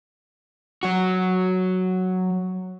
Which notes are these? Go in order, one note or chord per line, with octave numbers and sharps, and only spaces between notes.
F#3 F#4